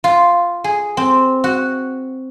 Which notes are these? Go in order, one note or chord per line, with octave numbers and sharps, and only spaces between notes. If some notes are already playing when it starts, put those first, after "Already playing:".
F4
G#4
C4
F#4